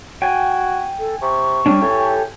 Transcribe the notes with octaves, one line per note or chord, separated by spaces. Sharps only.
F#4 G5 G#5
A4
C3 C#6
G3 C#4 D4
A2 G4 A4 G#5